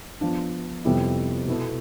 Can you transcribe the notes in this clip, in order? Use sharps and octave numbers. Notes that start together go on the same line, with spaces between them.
F3 B3 D4
F2 C3 G3 B3 E4
B2 B3 E4 A4